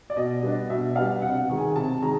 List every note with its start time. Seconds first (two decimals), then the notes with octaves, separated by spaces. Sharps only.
0.10 D5
0.16 B2 D#5
0.43 G3 B3 D4
0.70 B2 E5
0.96 G3 B3 D4 F5
1.22 C3 F#5
1.50 D#3 G#3
1.58 G#5
1.76 C3 A5
2.02 D#3 G#3 A#5